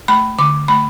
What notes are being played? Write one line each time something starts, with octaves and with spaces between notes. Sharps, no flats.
A3 B5
D3 D6
A3 B5